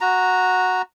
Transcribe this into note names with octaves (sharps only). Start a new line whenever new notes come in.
F#4 A#5